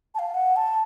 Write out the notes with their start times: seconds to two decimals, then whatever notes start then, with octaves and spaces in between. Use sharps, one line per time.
0.15 A5
0.19 F5
0.34 F#5
0.56 A5